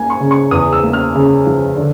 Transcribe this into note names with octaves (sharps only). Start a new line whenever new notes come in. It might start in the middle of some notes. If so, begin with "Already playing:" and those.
Already playing: A#3 G#5
C#6
C#3
C#6
E2 D#6
E6
A#3
F6
C#3
F3
D3